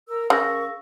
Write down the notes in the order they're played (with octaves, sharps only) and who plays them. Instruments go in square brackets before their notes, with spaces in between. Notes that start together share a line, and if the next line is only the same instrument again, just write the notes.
[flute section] A#4 E6
[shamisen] C#3 [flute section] A#4 C#6 [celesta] F5 E6 A#6